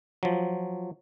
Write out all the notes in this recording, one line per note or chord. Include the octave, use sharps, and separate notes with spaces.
F3 F#3